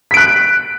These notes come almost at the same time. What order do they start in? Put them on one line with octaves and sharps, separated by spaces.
B6 D7 F#6